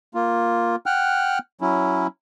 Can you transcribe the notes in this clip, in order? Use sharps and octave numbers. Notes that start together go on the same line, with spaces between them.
A#3 F4
F#5 G5 F6 F#6
F#3 C#4 E4